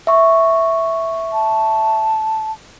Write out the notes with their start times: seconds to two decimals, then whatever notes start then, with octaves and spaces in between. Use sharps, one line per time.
0.07 E5 C#6
1.33 A5